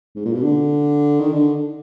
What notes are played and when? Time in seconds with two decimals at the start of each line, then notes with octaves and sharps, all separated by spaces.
0.16 G#2
0.25 A#2
0.33 B2
0.43 D3
1.20 D#3
1.33 D3